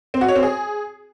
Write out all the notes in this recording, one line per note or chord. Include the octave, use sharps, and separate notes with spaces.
C4
F#4
C#5
C4
G#4